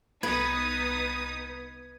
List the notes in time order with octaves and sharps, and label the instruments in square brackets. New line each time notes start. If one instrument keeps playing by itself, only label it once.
[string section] C2 D#4 D#6 [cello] B3 [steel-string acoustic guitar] B4 [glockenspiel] G#6